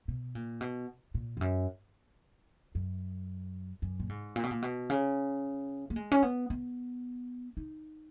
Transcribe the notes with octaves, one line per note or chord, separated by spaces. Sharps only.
B2
A#2
B2
A#2
F2
F#2
F#2
F#2
A#2
G#2
A#2
B2
A#2
B2
C#3
A#3
G#3
C#4
B3
B3
D#4